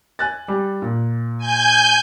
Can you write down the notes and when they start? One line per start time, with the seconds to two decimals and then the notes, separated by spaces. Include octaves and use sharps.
0.19 G#5 F#6 A6
0.48 G3
0.82 A#2
1.38 G#5 G6